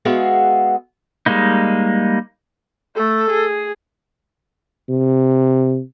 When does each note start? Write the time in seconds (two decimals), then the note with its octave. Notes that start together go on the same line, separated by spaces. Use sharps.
0.05 G#3 B3 F#4 G#4 E5 F5
1.26 G3 G#3 A#3 D#4
2.96 A3 A4
3.30 G#4
4.88 C3